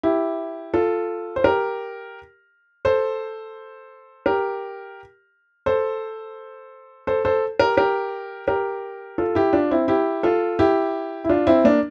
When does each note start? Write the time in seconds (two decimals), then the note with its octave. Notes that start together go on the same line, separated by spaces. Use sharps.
0.03 E4 G4
0.74 F4 A4
1.36 C5
1.44 G4 A#4
2.85 A4 C5
4.26 G4 A#4
5.66 A4 C5
7.07 A4 C5
7.25 A4 C5
7.59 G4 A#4
7.77 G4 A#4
8.47 G4 A#4
9.18 F4 A4
9.35 E4 G4
9.53 D4 F4
9.71 C4 E4
9.88 E4 G4
10.23 F4 A4
10.59 E4 G4
11.24 E4
11.29 D4 F4
11.47 C4 E4
11.64 A#3 D4